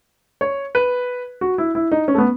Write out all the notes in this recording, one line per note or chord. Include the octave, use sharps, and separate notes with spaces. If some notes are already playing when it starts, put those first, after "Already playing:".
C#5
B4
F#4
E4
E4
D#4
C#4
A3
B3